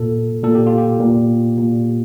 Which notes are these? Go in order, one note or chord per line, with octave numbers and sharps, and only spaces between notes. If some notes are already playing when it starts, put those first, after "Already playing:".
Already playing: A#2 A4
A#2 A4
G4
F4
G4
A#2
A#2